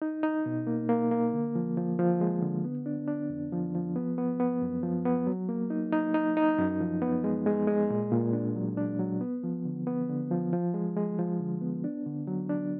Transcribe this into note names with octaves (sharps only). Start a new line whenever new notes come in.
D#4
D#4
B2
A#3
A#3
A#3
D3
F3
F3
F3
G#3
D3
B3
D4
D4
F2
F3
F3
B3
B3
B3
F#2
F3
B3
F#3
A#3
D#4
D#4
D#4
D#4
F#2
F3
B3
G#3
G#3
G#3
A#2
A#2
D4
F#3
D4
F#3
B3
F3
D3
B3
D3
F3
F3
G#3
G#3
F3
D3
B3
D4
D3
F#3
D4